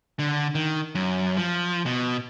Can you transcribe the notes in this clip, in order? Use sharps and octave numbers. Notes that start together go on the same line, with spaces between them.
D3
D#3
F#2
F3
B2